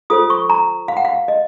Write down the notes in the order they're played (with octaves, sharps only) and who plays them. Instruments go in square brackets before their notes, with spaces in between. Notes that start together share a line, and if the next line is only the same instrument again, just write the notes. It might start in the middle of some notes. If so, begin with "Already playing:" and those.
[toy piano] F4 A4 C5 D#6
C#6
A#5
F5
F#5
F5
D#5